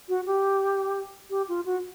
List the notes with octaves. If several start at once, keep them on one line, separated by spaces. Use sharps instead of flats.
F#4
G4
G4
F4
F#4